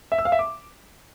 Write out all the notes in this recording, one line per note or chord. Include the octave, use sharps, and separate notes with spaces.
E5
E6
F5
E5
D6